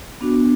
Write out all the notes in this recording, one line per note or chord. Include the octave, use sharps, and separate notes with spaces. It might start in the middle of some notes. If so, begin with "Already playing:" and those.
B3 D4 F#4